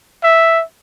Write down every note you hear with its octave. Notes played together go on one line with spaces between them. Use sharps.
E5